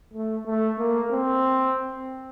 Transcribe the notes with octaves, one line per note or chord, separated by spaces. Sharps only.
A3
A3
A#3
C4